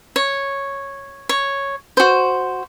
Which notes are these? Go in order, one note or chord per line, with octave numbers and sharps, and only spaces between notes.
C#5
C#5
F#4 C5